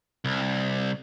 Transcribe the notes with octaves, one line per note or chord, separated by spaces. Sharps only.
C2